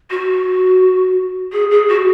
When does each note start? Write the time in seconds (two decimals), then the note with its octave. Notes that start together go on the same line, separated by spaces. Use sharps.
0.10 F#4
1.52 G#4
1.71 G#4
1.88 F#4